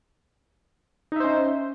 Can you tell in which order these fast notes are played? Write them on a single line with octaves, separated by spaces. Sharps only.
D#4 E5 C5 C#4